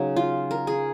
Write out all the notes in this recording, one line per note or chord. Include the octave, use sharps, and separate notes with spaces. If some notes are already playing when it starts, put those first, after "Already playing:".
Already playing: C#3 F#3 D#4
F4
A#4
G#4